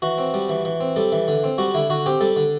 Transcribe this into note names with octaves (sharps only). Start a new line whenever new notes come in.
E3 F#4
C4
G3
E3
E3
C4
G3 A4
E3
D3
C4
G3 F#4
D3 E4
D3 F#4
C4 G4
G3 A4
D3